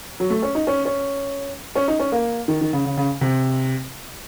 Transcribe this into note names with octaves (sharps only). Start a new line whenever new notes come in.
F#3
A3
C#4
D#4
C#4
C#4
C#4
D#4
C#4
A#3
D#3
D#3
C#3
C#3
C#3
C3